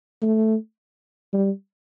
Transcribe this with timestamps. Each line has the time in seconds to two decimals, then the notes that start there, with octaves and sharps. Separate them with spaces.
0.22 A3
1.33 G3